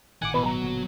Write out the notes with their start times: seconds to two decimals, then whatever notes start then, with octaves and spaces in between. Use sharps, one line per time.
0.22 G#1 A2 D#3 F#5 G#5 D6
0.34 B2 E3 B4
0.46 F#3 A#5
0.62 G1 A#2 D3